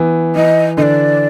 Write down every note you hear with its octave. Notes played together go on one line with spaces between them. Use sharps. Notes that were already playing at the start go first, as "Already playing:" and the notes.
Already playing: E3 B3
E3 D#5
D3 D#5
D5